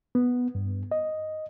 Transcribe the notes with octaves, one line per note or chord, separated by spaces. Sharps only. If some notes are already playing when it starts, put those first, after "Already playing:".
B3
G2
D#5